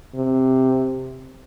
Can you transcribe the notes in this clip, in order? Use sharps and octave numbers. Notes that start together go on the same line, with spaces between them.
C3